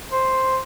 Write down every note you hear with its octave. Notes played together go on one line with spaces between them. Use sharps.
C5